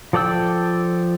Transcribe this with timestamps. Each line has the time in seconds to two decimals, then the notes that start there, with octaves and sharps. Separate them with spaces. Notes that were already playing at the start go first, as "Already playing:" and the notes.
0.13 F3 A4 D5 G5 E6